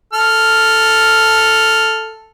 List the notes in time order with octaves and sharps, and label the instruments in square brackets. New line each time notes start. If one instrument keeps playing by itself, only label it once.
[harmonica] A4 F6